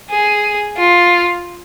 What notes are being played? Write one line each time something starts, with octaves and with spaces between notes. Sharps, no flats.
G#4
F4